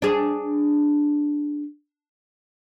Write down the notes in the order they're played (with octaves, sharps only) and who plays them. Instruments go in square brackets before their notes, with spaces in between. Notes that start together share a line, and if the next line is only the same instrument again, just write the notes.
[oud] D4 G#4